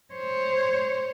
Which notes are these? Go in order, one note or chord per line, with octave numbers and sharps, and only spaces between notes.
C5 C#5